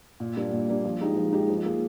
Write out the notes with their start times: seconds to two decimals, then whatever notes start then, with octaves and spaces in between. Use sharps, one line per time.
0.20 A#2
0.37 G3 A#3 D4
0.53 A#2
0.69 G3 A#3 D4
0.84 F3
1.01 G#3 D#4 G4
1.16 F3
1.33 G#3 D#4 G4
1.49 F3
1.65 A#3 F4 G#4